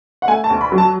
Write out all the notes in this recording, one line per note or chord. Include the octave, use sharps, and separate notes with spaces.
F#5
A3 G#5
A5
D2
B5
F#3
A5